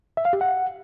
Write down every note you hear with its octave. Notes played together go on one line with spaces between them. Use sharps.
E5
F5
G4
F#5